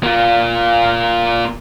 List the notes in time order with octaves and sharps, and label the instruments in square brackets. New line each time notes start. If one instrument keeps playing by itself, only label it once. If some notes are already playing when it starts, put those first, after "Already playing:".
[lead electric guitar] A#3 F4